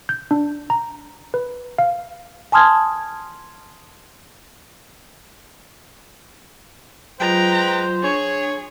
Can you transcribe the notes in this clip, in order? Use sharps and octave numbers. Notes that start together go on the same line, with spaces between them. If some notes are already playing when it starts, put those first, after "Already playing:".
G6
D4
A#5
B4
F5
G#5 A5 C6 D#6 F6 G#6
F#3 G#3 F4 B4 C5 G5 A#5 C6
D4 G#4 C#5